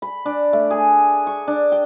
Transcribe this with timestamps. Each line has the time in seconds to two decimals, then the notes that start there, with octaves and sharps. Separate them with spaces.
0.02 B5
0.25 D4
0.53 A3
0.70 G#4
1.27 C#6
1.48 D4
1.72 G5